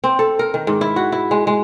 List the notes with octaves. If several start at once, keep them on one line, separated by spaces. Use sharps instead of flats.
C4
A4
A#4
D#3
G#2
E4
F#4
E4
G#3
G#3